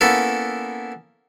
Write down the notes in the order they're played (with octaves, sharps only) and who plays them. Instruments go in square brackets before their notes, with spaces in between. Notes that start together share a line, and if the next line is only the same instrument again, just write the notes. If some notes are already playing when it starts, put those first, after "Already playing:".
[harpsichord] A#3 B3 C#4 E4 A4